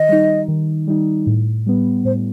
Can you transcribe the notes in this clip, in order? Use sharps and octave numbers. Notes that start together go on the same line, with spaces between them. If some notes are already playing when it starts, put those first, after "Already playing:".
Already playing: D#3 D#5
G3 D#4
D#3
G3 D#4
A2
G3 B3
A2 C5